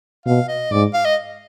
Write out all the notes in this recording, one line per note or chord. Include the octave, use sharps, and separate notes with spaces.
B2 F5
D#5
G#2 D5
F5
D#5